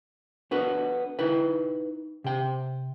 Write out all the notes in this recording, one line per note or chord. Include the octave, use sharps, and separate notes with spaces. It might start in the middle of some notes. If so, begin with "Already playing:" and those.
B3 D4 F#4 A4 B4
D#4 E4 B4 G5
C3 G5